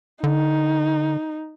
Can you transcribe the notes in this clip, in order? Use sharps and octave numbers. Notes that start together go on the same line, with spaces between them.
D3 D#4